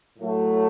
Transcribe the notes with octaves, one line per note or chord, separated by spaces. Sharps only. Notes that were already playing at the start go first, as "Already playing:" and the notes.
A2 F#3 A3